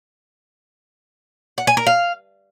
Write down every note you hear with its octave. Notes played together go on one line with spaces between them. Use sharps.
F#5
G#5
A#4
F5